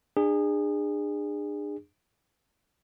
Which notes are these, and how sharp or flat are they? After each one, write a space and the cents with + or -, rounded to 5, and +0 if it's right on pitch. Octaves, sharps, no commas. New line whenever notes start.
D4 +30 G#4 -25